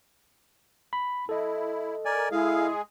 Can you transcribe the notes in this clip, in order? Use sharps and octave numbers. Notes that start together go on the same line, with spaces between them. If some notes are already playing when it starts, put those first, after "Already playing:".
B5
E4 A4 D#5
A#4 D5 G#5
G#3 E4 G#4 F5